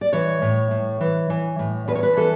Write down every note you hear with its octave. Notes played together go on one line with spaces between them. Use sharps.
D5
E3 C#5
A2
A2
E3
E3
A2
E2 B4
C#5
B4
E3 A4